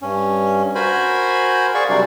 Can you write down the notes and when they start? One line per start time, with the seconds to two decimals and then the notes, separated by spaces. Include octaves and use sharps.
0.02 G2 C#4
0.75 F#4 A#4 C5 G#5 B5
1.75 G#4 D5 F5 C#6
1.89 C3 F#3 G3 D4 F#4 D5